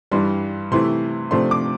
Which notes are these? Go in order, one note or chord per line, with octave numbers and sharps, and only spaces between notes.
G2 E3 G3 C6
C3 E3 A3 E4 C6
C3 F3 A3 D4 C6
D6